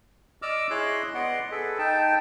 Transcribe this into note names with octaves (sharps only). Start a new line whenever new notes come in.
D5 D#5 D6 E6 F6
E4 G#4 C#5 D#5 C6 F#6
B3 D5 D#5 F#5 C6
G#4 A4 B4
D#4 G5 A5